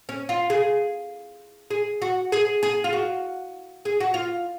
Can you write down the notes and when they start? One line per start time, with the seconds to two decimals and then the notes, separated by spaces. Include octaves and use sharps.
0.09 C#4
0.29 F4
0.50 G#4
1.71 G#4
2.02 F#4
2.32 G#4
2.63 G#4
2.84 F4
2.93 F#4
3.85 G#4
4.00 F#4
4.14 F4